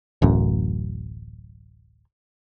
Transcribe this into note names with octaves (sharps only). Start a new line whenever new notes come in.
D1 A1 F#2